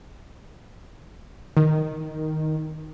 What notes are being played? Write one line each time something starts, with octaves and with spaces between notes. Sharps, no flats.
D#3